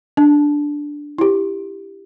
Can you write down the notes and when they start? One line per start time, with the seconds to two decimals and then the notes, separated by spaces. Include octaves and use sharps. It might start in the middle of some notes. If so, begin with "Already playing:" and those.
0.17 D4
1.18 E4 G4